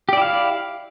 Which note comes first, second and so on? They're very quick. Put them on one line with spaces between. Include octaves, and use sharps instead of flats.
G4 D5 E4 F5